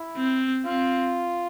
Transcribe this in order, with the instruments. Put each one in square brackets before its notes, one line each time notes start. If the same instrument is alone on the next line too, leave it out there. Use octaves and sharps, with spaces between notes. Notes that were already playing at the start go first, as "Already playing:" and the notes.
Already playing: [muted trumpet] E4
[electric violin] C4
[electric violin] C4 [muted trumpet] F4